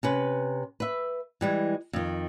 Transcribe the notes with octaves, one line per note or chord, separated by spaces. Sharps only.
C3 C#4 B4
B4 E5
E3 G3 G#3
F2 D#3